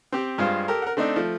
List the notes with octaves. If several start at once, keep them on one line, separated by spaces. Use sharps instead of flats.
C4 G4
G2 G#3 F4 C5 F5
G4 A4 A#4
A#4 F#5
A3 C4 D4 D#4
F3 A3